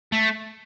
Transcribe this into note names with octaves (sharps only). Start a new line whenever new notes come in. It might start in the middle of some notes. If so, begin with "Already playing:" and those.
A3